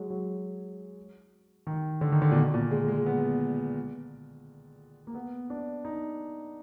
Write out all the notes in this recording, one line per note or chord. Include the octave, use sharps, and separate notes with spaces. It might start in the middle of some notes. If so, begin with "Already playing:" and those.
Already playing: F#3 G#3
F#3
D#3
D3
D#3
D3
A#2
B2
A#2
G#3
G#3
B3
A#3
B3
D4
D#4